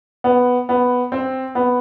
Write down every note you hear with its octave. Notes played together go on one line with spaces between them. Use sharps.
B3
B3
C4
B3